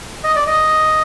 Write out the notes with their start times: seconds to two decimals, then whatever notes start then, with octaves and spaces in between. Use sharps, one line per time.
0.24 D#5
0.36 D5
0.47 D#5